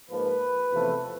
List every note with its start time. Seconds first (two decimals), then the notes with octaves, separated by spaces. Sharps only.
0.11 G#2 F3 A#3 B4
0.72 E2 C3 F3 A3 C4